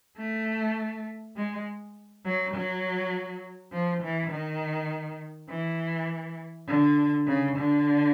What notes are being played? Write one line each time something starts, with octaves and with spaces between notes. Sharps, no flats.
A3
G#3
F#3
F#3
F3
E3
D#3
E3
D3
C#3
D3